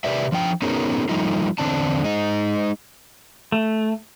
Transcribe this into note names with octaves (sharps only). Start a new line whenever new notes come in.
C3 G4 B4 D5 E5
F3 D4 G5
B3 C#4 D#4 F#4 G#4 A#4
F3 G3 A3 D#4 F4
E2 G#2 D3 C4 D4 A5
G#3 D#4
A3